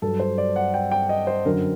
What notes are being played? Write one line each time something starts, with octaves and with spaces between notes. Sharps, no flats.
G2 F#3 A4
C5
D5
F#5
G5
G5
D#5
C5
F#2 D3 F#3 A#4